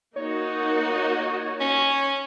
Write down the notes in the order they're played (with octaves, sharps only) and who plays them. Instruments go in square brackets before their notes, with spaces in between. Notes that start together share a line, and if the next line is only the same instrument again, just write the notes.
[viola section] A#3 D#4 F#4 [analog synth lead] C#5
[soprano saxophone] C#4